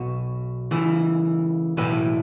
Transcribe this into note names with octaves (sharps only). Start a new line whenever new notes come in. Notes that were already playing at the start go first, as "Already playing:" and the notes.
Already playing: B1 B2 F#4
C#2 C#3 E3
B1 A2 E3 B4